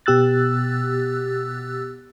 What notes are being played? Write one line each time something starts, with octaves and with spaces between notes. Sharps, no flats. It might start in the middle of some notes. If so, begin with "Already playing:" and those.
B2 B3 G4 E6 F#6 A6